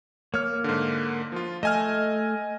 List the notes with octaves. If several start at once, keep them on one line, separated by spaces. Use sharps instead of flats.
A#3 C#5 F6
G#2 D3
F3 F4
A3 D#5 G#5 F6